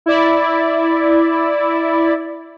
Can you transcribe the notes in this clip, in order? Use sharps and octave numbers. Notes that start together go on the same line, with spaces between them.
E4 D5